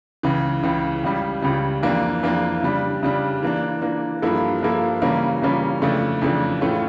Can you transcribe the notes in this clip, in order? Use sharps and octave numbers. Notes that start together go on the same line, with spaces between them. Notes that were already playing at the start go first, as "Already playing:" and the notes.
C#2 C#3 E3
C#2 C#3 E3
C#2 C#3 G3
C#2 C#3 G3
F2 E3 A#3 D4 F4
F2 E3 A#3 D4 F4
C#3 G3 D4
C#3 G3 D4
E3 A#3 D4
E3 A#3 D4
G2 F3 A#3 E4 A4
G2 F3 A#3 E4 A4
C#3 E3 G3 A#3 C#4
C#3 E3 G3 A#3 C#4
F2 C#3 E3 A3 D4
F2 C#3 E3 A3 D4
A2 E3 A3 C#4 F4